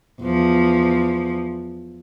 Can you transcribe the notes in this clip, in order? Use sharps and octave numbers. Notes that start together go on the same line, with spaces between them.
E2 F3